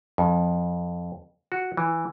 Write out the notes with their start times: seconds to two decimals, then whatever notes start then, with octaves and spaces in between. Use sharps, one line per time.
0.18 F2
1.52 F#4
1.77 E3